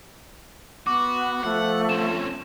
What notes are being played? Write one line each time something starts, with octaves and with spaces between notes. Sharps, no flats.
B3 F#4 D6
F3 A3 F#5
C4 C#4 E7